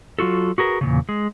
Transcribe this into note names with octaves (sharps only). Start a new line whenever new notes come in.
F#3 F4 F#4 A4
F#4 G#4 A#4 B4
E2 A#2 C#3
G#3